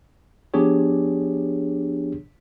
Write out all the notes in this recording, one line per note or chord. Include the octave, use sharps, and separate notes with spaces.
F3 B3 D4 G4 G#4 C#5